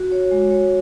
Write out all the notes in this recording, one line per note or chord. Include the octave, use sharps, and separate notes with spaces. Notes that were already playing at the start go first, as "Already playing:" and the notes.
Already playing: F#4
C#5
G#3
C#5